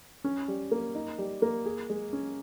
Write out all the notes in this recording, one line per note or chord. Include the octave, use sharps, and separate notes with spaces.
C#4
G3
A#3
D#4
G3
A#3
G#4
G#3
C#4